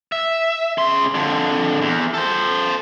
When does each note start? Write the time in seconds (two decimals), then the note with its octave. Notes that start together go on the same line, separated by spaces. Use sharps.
0.12 E5
0.78 C#3 C6
1.14 F2 D3
1.82 E2
2.14 A4 C5